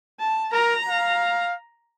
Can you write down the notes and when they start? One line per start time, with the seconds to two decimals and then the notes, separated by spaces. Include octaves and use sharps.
0.20 A5
0.53 A#4 A#5
0.89 F5